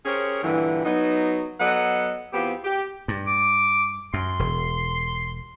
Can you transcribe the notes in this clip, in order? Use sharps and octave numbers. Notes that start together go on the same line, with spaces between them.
C#4 G4 G#4 A#4 C5 C#5
G2 A#2 D3 E3
F#3 B3 D#4
F#3 B3 A4 D#5 F#5
E2 B3 C4 F4 G4
G4
G2
D6
F#2 C6
E1